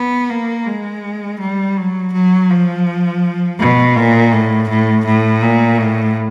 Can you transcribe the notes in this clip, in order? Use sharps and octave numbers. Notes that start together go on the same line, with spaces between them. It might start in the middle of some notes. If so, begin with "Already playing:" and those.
Already playing: B3
A#3
G#3
G3
F#3
F#3
F3
B2
A#2
A2
A2
A2
A#2
A2